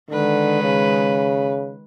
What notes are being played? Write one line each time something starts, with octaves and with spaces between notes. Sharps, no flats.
D3 D#3 G#3 B4
C#3